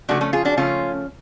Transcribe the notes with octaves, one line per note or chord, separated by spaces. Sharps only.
C#3 F3 A3 D4 F#4
A3 C#4
F4 G#4
D4 F#4
C#3 F3 A3 C#4 F4